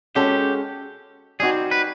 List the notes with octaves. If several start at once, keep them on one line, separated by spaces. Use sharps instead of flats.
G#3 C#4 F#4 G4 A4
G3 C4 D#4 F#4 G#4
B4